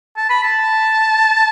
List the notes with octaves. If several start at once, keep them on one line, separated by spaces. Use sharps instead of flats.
A5
B5
A5